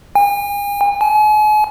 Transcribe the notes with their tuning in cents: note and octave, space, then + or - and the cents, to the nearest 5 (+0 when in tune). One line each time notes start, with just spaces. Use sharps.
G#5 -40
G#5 +40